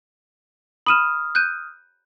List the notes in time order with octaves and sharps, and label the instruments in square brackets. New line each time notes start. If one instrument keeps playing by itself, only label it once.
[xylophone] B5 D#7 E7 [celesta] D#6 F6
[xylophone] F#6 G6 D#7